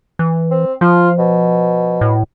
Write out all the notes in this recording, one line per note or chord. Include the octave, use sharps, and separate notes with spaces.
E3
C4
F3 F4
B2
A2